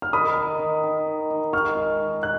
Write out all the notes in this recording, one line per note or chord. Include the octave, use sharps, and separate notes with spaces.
F6
D#3 B5 D#6
D#4
D#3
D#3
D#3
D#4
G#3 C#6 F6
G#3
D#3
G#3 F#6